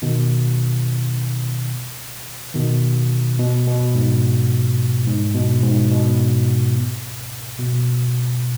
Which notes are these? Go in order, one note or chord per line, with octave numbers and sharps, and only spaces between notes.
B2 D#3
B2 D#3
B2
B2
G#2
G#2
B2
G#2
B2
B2